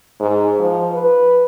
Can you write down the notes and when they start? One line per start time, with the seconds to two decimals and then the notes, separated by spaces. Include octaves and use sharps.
0.20 G#2
0.60 F3
0.92 B4